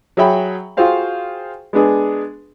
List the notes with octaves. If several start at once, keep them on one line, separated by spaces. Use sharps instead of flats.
F#3 G#4 C#5 E5 G5 B5
F4 F#4 G#4 C5 F5 G5
G#3 B3 D4 G#4